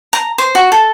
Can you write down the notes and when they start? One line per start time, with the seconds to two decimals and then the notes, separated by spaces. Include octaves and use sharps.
0.13 A#5
0.38 C5
0.55 F#4
0.72 A4